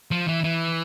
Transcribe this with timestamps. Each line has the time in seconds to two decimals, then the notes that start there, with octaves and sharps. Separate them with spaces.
0.11 F3
0.28 E3
0.44 E3